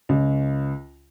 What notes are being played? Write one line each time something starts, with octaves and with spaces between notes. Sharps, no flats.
C#2